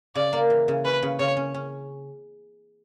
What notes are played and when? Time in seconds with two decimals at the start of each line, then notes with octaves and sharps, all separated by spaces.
0.15 C#3 D5
0.33 A#3
0.50 E3
0.68 C#3
0.85 C#4 B4
1.02 C#3
1.19 C#3 C#5
1.37 C#4
1.54 C#4